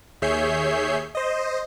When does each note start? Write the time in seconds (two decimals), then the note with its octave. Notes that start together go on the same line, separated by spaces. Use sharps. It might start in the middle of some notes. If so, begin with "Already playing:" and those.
0.22 D#2 G#4 C#5 E5 G6 C7
1.15 C5 D#5